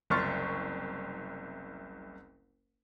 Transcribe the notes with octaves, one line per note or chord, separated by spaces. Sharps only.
F#1 C2 C6 C#6 F6 A6